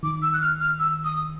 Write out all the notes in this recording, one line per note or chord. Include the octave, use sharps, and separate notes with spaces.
D#3 D6
E6
F#6
F6
F6
E6
D#6